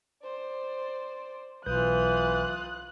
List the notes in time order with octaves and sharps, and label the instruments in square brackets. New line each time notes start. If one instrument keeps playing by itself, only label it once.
[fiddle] C5 D5
[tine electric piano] B1 B4 G6 [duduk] E3 [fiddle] F4 D#6 [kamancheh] F#6